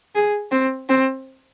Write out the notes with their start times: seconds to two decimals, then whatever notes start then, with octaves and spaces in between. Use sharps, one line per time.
0.15 G#4
0.52 C4
0.89 C4